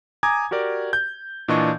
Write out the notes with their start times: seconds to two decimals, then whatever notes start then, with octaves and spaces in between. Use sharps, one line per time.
0.23 G#5 A#5 D6 D#6 G#6
0.51 F#4 G4 A#4 D5
0.93 G6
1.48 A#2 E3 D4 D#5 A5 C#6